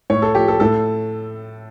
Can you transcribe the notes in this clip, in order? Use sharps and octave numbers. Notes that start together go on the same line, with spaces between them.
A2 C#5
A4
F3 G4
A4
A2 A4